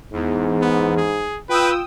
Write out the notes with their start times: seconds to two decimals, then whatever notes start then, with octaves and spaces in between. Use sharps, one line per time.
0.13 E2 G#2
0.62 B3
0.97 G#4
1.49 F4 B4 G5 D#6 E6